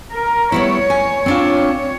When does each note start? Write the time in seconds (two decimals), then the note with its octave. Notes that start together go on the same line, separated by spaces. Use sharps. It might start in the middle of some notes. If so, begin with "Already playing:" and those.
0.12 A#4
0.52 G3 B3 E4 C#5
0.90 G#5
1.26 C4 D4 F4